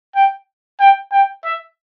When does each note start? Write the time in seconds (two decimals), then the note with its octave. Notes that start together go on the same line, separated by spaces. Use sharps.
0.16 G5
0.80 G5
1.12 G5
1.44 E5